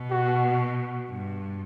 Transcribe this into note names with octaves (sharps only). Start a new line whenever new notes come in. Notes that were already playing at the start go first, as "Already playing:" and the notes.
Already playing: B2
F#4
G2